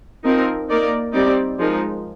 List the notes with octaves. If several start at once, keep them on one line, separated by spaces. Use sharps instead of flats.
F3 C4 D#4 A#4
A#3 D#4 A#4 D5
G3 C4 D#4 G4 D5
F3 G#3 D#4 A#4